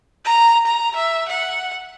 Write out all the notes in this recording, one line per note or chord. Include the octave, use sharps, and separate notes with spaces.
A#5
A#5
E5
F#5